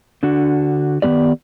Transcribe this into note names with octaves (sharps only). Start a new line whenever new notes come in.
D3 D4 F#4
D#3 E3 B3 G4 D5